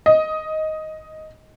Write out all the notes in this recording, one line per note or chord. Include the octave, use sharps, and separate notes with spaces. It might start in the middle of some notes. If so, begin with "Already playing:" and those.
D#5